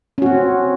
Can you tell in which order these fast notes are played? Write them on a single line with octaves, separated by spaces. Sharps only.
C#4 F#4 C4